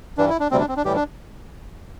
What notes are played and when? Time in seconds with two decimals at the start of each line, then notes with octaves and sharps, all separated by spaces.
0.18 G2 E3 G3 D4
0.29 E4
0.40 D4
0.51 D2 C3 G3 C4
0.60 D4
0.68 C4
0.77 D4
0.84 A2 E3 G3 G4
0.96 D4